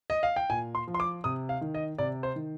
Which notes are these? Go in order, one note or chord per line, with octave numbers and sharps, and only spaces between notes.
D#5
F5
G5
A#2 G#5
C6
F3
C6
D6
C3 D#6
F5
D#3
D#5
C3 D5
C5
D#3